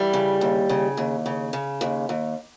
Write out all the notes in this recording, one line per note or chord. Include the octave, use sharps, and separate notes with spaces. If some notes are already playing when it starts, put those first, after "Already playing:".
Already playing: E3 G3
C#3
D#2
C#3
D#2
C#3
C#3
D#2
D#2